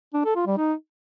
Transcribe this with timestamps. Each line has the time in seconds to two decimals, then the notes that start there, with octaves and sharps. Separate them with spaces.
0.14 D4
0.25 A4
0.36 F4
0.46 G3
0.57 D#4